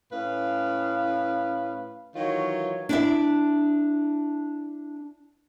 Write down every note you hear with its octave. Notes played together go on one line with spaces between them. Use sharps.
A2 C#4 B4 F5
D#3 E3 F#3 F4 C#5
D4 E4 E5